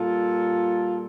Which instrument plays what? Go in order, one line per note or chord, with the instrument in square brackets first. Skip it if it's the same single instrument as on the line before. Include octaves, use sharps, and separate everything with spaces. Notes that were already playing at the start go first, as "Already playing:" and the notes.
Already playing: [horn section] A#2 G3 F4 A4